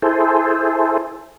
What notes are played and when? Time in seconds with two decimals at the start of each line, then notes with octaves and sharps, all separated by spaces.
0.02 E4 G#4 A4 C5